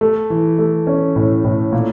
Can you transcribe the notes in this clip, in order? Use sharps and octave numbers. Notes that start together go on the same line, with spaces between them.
A3
E3
A3
C#4
A2
A2
A#2